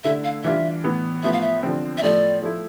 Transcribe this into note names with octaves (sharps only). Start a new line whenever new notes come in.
D3 A3 E4 E5
F5
E3 G3 D4 F4 E5
A2 E3 B3
A2 F3 B3 E5
F5
E5
D3 F3 C4
E5
A2 F3 A3 D5
F3 A3 E4